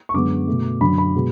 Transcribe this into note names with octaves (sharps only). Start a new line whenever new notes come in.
C#6
F#2 D3 G#3 B3 D6
B2 A3
F#2 D3 F#3 B5
B5
B2 G#3